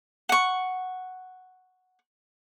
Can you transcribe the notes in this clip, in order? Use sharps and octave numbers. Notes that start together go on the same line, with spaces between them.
F#5 C#6